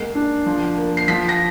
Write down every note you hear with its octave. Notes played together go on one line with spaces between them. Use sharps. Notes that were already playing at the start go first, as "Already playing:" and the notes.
Already playing: G#3 A#3 C7
D4
F3
A#3
C7
F3 B6
A#6